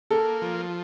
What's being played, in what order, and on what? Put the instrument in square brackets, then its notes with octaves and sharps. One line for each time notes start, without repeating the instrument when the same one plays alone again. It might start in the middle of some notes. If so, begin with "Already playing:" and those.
[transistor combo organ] A#3 [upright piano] A4
[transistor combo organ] F3